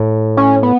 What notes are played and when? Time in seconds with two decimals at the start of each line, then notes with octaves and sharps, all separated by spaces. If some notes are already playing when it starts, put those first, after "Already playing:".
Already playing: A2
0.37 C#4
0.63 B3